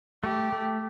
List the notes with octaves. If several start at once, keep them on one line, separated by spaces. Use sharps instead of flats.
A3 G4
A3